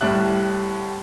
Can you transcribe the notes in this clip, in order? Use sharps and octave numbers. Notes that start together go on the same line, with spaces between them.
C2 A2 G3 D5 E5 F#6